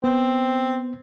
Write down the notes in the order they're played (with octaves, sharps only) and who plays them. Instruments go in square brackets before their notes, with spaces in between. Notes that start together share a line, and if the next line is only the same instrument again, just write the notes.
[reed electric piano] B3 [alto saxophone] C4